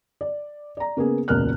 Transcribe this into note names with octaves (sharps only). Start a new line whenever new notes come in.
D5
D5 A#5
C#3 A#3 B3 G#4
E1 C#2 A#2 A#4 F6 F#6